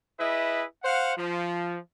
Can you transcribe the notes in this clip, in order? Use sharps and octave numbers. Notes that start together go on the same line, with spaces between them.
E4 G#4 B4 D#5 E5
C5 F5 F#5
F3